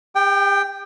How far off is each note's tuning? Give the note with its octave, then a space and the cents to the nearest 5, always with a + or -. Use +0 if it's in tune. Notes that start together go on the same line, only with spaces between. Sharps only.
G4 +40 G5 +0